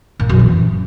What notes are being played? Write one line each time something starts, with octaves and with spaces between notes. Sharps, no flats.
A#2
F#2
E3